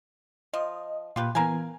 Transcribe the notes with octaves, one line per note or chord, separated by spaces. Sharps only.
F3 D#5
A#2 F4 G4 B4
E3 B3 A#4 F5 G#5